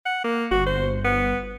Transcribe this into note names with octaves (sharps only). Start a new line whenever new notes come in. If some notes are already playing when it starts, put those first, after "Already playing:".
F#5
A#3
G1 F#4
C5
B3